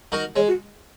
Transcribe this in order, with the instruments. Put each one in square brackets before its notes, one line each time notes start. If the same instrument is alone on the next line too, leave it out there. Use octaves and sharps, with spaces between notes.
[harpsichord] D#4 F#4 A#4
[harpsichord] G#3 [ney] C#5
[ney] F#4